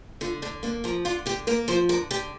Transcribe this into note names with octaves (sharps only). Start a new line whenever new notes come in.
D3 F4
D3 D4
A#3 D4
F3 A#4
D3 F4
D3 G4
A#3 A#4
F3 C5
D3 A#4
D3 G4